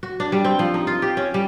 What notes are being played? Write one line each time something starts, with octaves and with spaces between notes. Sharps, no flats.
F#4
D4
G3
C4
F3
D#4
F4
G4
C#4
G3